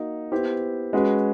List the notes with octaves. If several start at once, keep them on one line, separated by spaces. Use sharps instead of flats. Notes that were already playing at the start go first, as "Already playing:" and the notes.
Already playing: A#3 D#4 F#4
B3 E4 G4 C5
G#3 C#4 F#4 B4